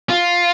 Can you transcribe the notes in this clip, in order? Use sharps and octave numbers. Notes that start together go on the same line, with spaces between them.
F4